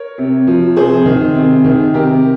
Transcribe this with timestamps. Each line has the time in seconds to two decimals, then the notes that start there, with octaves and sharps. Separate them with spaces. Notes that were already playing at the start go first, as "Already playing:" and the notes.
Already playing: A#4 C#5
0.18 C3
0.47 F3
0.77 C3 G#4 C5
1.06 D#3
1.35 C3
1.65 D#3
1.94 C3 G4 A#4